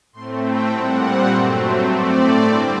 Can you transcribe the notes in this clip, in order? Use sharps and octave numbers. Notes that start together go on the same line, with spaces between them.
A2 A3 C4 C6
G5
A#2 G3 C4 F#5
G2 F#3 A3 C4
A2 A3 C4 D5
G2 D3 G3 C4 A#4